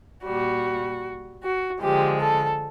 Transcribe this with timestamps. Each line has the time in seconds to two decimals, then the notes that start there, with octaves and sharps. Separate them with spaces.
0.24 A#2 G3 F#4
1.43 F#4
1.82 D3 F3 G#3 G4
2.21 A4